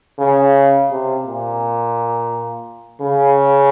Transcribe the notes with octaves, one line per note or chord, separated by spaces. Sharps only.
C#3
C3
A#2
C#3